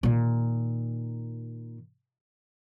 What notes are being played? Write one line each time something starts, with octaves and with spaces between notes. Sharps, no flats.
A#2 D#3